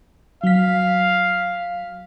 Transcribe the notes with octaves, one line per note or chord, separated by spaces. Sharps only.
F#3 F5 B6